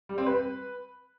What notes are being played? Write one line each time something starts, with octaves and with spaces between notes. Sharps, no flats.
G3
C4
B4